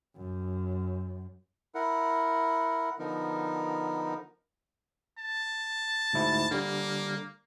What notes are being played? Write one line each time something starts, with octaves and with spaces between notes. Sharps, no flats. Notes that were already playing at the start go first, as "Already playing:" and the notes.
F#2
E4 A#4 F#5
D3 F3 B3 D#4 A#4
A5
D2 G#2 E4
D3 G3 A#3